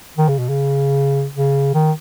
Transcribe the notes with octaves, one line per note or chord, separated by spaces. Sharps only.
D#3
C#3
B2
C#3
C#3
D#3